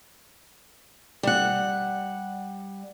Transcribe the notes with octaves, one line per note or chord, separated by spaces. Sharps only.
G3 F#5